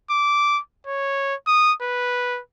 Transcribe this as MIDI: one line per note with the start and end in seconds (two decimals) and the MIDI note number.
0.10 0.60 86
0.87 1.35 73
1.47 1.73 87
1.82 2.40 71